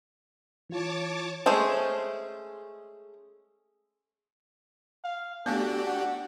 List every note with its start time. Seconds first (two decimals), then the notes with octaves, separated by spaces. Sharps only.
0.70 E3 F4 C#5 A5 D6
1.46 G#3 A3 C#4 G#4 C5
5.04 F5
5.46 A3 B3 D4 F#4 G4 A4
5.86 F#5